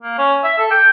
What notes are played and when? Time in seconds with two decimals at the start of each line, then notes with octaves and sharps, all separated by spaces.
0.03 A#3
0.18 C#4
0.44 E5
0.58 A4
0.71 G5